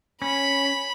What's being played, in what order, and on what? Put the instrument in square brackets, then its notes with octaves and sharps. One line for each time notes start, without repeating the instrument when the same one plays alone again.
[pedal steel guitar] C#4 [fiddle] B5